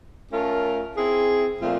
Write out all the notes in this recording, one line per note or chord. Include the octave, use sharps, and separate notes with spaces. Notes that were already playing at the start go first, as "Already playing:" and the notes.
A3 C#4 F4 A#4
C4 E4 G#4
A#2 F3 A3 C4 F4